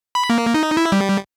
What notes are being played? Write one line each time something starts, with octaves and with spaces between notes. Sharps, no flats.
B5
A#3
D#4
E4
G3